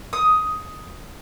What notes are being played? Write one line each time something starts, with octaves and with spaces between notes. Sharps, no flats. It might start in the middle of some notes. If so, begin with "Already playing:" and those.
D#6